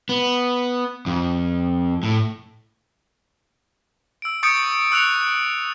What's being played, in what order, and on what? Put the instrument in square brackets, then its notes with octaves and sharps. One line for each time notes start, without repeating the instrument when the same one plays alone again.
[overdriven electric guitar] B3
F2
A2
[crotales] E6 D7
C#6 D#6 G6 A6 C#7 D7
C#6 E6 F#6 C#7 F7